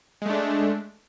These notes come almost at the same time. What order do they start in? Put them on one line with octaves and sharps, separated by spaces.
G#3 A3 D4